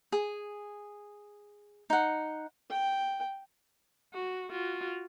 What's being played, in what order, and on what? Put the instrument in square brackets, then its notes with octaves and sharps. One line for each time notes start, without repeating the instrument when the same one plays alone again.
[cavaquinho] G#4
D#4 F#5
[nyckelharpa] G5
[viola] F#4
F4 F#4